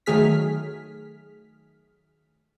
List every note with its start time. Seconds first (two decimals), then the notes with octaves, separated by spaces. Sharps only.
0.06 D#3 F#3 A3 G#4 F6 B6